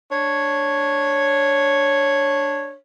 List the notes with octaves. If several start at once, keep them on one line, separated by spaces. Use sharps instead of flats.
D4 C#5